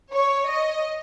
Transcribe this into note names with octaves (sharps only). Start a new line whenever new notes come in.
C#5
D#5